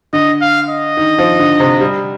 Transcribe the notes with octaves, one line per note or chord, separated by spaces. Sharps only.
D3 D#5
F5
D#5
D#3
F3
D3
C3
G3